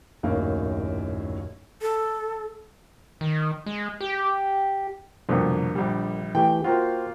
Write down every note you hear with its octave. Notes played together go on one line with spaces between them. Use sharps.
D#1 A#1 F#2 A2 A#3 D#4
A4
D#3
G#3
G4
C2 F2 B2 D3 A#3
A#1 G3
E3 A3 G4 G5
A#3 F4 F#4 C5 G5